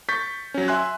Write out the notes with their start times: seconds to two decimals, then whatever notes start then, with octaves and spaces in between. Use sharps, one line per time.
0.09 C#6 G6 A6 B6
0.54 F#3 C#4
0.68 E5 G#5 C6 F#6